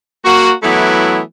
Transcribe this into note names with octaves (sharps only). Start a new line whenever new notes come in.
A#3 F#4
E3 F#3 A3 B3 E4